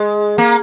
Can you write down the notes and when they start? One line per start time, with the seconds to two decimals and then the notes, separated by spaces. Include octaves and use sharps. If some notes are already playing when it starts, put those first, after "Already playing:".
Already playing: G#3
0.38 A#3